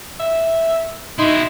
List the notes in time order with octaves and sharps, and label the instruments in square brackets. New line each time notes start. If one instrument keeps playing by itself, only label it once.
[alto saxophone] E5
[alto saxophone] D#4 [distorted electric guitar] E4 F#4 [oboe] C6